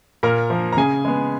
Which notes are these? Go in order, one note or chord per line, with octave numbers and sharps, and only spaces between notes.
A#2 A#4 A#5
F3 A#3
A#5
C#3 G#4 G#5
G#3 B3